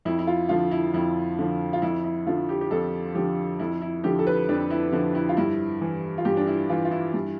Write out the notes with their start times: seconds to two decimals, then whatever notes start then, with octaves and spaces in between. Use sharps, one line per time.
0.05 F2 E4
0.19 E4
0.27 F4
0.49 D3 F3 F4
0.71 E4
0.94 F2 E4
1.39 D3 F3
1.73 F4
1.82 F2 E4
2.04 E4
2.27 D3 F3 F4
2.49 G4
2.61 G4
2.71 F2 A4
3.15 D3 F3 G4
3.60 F2 E4
3.82 E4
4.04 D3 F3 G4
4.19 A4
4.27 B4
4.49 F2 D4
4.71 E4
4.93 D3 F3 E4
5.15 E4
5.29 F4
5.37 G2 E4
5.81 E3
6.18 F4
6.25 G2 G4
6.37 D4
6.47 E4
6.70 E3 F4
6.85 F4
6.91 E4
7.14 G2